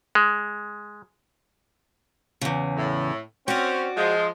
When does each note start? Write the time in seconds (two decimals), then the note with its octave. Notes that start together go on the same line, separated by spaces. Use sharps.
0.15 G#3
2.41 E2 C#3
2.77 A2
3.48 C4 C#4 F#4 D5
3.97 F3 G#3